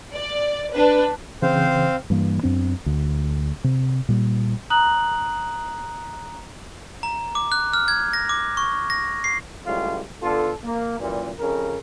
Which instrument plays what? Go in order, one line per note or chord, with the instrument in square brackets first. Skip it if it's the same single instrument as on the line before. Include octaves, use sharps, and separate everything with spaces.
[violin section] D5
D4 B4
[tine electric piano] C#3 E3 [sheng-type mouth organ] C4 C5 F5
[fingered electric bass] G2 E3 A#3
F#2 B3 C4 D4
D2
C3
A#2 G3
[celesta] A#5 D#6 F#6 F#7
[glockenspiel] A#5
D6
F#6
F6
G#6
A#6
D6
C#6
A#6
C7
[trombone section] C#2 A2 F#3 G3 F4
D3 B3 F4 A4
A#3
F#2 A#2 E3 G3
F2 C#3 A#4